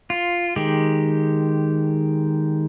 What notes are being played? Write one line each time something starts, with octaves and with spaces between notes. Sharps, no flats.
F4
D#3 G#3 G4